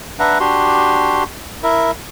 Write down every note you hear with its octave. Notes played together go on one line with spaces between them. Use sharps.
D4 B4 E5 F#5 A#5
D4 F#4 G4 C6
E4 A#4 E5